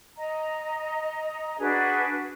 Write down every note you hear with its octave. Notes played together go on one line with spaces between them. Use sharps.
D#5 A#5
D4 F#4 G#4 B4